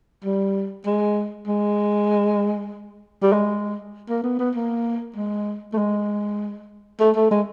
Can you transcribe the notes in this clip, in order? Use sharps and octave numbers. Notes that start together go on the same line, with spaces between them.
G3
G#3
G#3
G3
G#3
A#3
B3
B3
A#3
G#3
A3
G#3
A3
A3
G#3